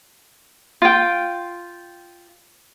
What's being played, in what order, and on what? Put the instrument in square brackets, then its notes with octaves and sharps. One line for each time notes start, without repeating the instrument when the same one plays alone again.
[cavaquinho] F4 G5